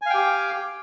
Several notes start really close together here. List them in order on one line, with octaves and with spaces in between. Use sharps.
G#5 F5 G5 G4